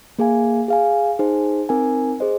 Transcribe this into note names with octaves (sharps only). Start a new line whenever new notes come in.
A#3 G#4 F5 G#5
G#4 F5 G#5
D#4 G#4 C5 G#5
C4 D#4 A#4 G#5
G#4 C5 D#5